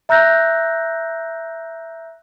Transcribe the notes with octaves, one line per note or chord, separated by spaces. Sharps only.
E5 A#5 E6 F#6 G6 A#6